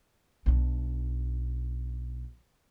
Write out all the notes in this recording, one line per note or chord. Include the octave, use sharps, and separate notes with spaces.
B1 D4